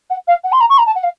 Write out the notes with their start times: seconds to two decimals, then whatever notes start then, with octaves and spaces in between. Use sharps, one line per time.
0.10 F#5
0.27 F5
0.43 F#5
0.52 C6
0.60 A#5
0.69 C#6
0.78 A#5
0.86 A5
0.95 F#5
1.03 F5